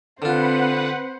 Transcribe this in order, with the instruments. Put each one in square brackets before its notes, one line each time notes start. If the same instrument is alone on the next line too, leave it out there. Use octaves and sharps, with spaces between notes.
[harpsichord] D3 F4 [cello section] C4 [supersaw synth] B4 F#5 [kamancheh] C5